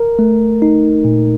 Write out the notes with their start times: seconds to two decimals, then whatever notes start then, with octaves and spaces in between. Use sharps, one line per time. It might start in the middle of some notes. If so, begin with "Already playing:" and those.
Already playing: A#4
0.19 A3
0.62 D#4
1.05 A#2